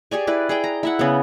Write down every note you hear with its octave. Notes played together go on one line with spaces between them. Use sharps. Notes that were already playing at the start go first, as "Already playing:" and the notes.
G4 G#4 D5 G#5
E4 B4 D5
G#4 D5 G5
A#5
E4 E5 F#5
C#3 B3